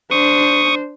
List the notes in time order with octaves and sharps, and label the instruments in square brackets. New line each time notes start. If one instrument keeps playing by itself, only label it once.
[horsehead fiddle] D4 C5 [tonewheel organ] C#6 D#6